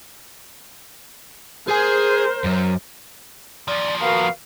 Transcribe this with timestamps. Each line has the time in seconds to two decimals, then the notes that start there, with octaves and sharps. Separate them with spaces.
1.68 G#4 A#4 C5 G#5
2.44 F#2 F#3
3.68 D#2 F3 D5
4.01 B3 F#4 A#4 F5